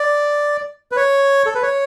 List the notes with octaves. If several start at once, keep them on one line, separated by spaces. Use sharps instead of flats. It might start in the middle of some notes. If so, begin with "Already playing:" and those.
Already playing: D5
B4
C#5
A4
B4
C#5